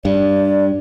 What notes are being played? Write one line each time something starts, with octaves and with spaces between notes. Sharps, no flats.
G2 D5